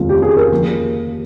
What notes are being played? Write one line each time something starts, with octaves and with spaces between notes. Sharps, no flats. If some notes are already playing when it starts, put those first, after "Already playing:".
Already playing: F1 D#2 C#3 G#3 C4 F4
G4
G#4
A#4
F3 A#3